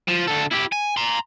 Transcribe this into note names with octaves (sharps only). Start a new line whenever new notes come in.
F3
D2 A4
E4 G4
G#5
A#5 C6